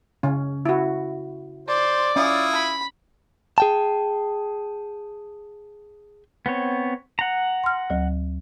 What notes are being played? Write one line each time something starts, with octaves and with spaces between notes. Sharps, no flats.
C#3 C#4
E4 F#4
C5 D5
C#4 E4 F4 D#6
B5
G#4 G5 A5
B3 C4 C#5
F#5 A#5
C6 F6
D2 F#3